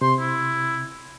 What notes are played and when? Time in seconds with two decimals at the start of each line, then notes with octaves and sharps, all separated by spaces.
0.01 C3 C6
0.20 E4